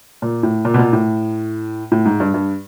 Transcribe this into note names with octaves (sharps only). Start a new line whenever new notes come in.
A#2
A2
A#2
B2
A#2
A2
A2
G#2
G2
G2